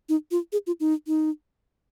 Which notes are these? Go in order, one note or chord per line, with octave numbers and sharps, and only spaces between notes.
D#4
F4
G#4
F4
D#4
D#4